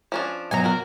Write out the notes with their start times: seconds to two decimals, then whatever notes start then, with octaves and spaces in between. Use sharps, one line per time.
0.12 F3 C#4 D4
0.51 B2 F#3 F#5 G#5 A#5
0.64 A#3 F#4 A#4